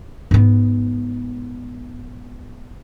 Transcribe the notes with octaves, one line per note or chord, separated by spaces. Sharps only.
G#2 B3